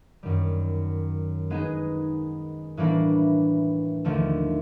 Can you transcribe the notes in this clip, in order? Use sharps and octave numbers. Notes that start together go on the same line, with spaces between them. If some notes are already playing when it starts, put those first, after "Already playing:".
F#2 D#3 G3
G#3 B3 D#4 G#4
A2 E3 G3 A#3 D4
D#2 D3 F3 A3